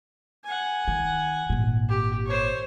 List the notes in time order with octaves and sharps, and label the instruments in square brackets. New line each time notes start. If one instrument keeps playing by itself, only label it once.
[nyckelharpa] F#5 G#5
[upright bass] D#3
G#1 A#2
[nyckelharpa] G4
C5 C#5